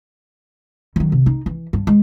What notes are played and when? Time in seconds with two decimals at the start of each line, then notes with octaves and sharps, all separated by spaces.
0.96 D#3 F#3
1.12 C3
1.26 D#4
1.46 E3
1.73 G2
1.87 G#3